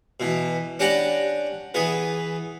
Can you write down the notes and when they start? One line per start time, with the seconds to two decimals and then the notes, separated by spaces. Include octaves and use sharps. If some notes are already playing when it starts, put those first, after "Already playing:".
0.20 B2 E3
0.79 C#4 D4 G4 F#5 A#5 B5
1.74 E3 B3 G#4